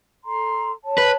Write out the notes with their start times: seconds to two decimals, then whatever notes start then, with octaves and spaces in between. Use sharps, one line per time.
0.24 A4 A#5 C6
0.84 C#5 A5
0.98 B4